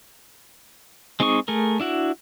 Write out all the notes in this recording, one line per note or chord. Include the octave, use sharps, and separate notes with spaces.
G#3 C4 D#4 G#4 C#6
A3 G#4 A#4
D4 E4 F#4